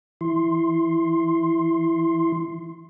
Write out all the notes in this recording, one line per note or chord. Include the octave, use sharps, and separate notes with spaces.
E3 E4 C6